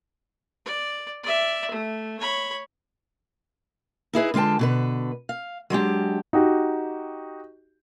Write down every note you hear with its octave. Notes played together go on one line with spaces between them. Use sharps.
D5
D5 E5
A3
C#5 B5
D#4 E4 G#4 B4
D3 G#3 F4 G5 A5
B2 D3 B4
F5
F#3 G#3 D4 G4
D#4 F#4 G4